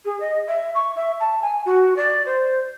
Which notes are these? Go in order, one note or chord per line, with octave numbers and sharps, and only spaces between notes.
G#4
D#5
E5
C#6
E5
A5
G#5
F#4
D5
C5